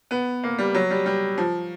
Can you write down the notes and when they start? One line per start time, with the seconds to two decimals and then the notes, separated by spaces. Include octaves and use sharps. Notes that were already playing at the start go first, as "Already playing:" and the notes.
0.11 B3
0.43 A#3
0.58 G3
0.75 F#3
0.90 G3
1.06 G3
1.38 F3